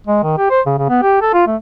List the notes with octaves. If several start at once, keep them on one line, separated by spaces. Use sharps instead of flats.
G#3
D#3
G4
C5
C#3
C#3
B3
G4
A4
F4
A3